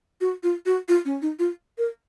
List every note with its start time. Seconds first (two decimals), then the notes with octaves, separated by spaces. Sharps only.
0.21 F#4
0.43 F4
0.66 F#4
0.88 F4
1.05 C#4
1.22 D#4
1.39 F4
1.78 A#4